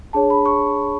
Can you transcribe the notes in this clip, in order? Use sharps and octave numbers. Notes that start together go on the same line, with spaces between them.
D4 G#4 C#5 A5
B5
C#6